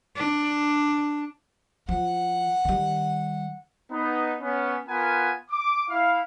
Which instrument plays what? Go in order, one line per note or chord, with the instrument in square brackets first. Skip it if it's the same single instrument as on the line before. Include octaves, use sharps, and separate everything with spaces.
[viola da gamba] D4
[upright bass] F3 [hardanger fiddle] F#5
[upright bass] D#3 G3
[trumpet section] B3 D#4
B3 C#4
B3 F4 A#4 F#5 G#5
D6
E4 F5